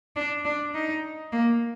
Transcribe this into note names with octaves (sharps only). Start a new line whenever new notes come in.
D4
D4
D#4
A#3